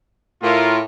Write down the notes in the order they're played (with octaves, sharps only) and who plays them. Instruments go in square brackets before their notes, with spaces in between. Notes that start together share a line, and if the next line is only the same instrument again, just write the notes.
[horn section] A2 [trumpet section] F4 A#4